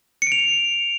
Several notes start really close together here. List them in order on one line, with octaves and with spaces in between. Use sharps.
C#7 D7 F7